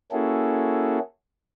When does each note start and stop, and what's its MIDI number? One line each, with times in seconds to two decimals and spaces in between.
0.12 0.99 58
0.12 0.99 61
0.12 0.99 64
0.12 0.99 66
0.12 0.99 68
0.12 0.99 69